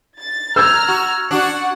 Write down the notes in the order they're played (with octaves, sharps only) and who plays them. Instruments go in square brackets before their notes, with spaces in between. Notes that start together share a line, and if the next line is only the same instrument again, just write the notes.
[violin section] A6
[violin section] A#5 F6 [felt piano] E6 G6 G#6
[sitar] F#4
[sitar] D4 F#4 [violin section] F#5